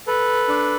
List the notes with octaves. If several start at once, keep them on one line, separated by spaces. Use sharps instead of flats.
A4 B4
D4